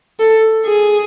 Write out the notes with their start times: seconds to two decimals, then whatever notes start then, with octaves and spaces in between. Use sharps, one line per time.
0.20 A4
0.66 G#4